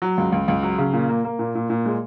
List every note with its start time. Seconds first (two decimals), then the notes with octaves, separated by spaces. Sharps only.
0.02 F#3
0.18 C#2
0.32 C#2
0.48 C#2
0.63 F#3
0.78 C#3
0.93 A#2
1.09 A#3
1.24 A#3
1.39 A#2
1.55 A#2
1.70 A#2
1.86 G#3